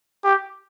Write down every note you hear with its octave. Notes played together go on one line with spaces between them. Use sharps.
G4